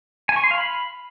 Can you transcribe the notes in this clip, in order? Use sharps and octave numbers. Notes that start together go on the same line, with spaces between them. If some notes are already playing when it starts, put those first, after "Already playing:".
G#5
C#6
C6
F5
B5